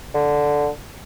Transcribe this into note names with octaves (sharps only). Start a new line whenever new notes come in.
D3